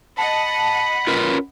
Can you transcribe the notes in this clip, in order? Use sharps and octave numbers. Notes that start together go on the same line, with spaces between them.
D#5 F#5 A5 B5
C#4 F4 A#4 B4